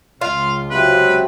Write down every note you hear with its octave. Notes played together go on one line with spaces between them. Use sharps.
C#2 F4 F5
C3 F#3 B4